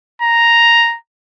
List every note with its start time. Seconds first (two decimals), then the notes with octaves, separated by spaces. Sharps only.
0.22 A#5